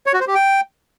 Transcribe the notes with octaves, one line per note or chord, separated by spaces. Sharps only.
C#5
F#4
C5
G4
G5